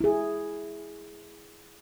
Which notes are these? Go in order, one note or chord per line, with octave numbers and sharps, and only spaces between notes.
E4 G#4